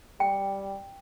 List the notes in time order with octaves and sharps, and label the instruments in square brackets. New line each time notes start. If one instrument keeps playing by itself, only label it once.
[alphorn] G3 [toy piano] G5